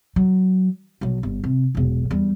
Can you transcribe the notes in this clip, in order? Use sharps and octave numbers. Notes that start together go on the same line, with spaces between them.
F#3
B1 F#3
G1
C3
E1 B1
E2 G3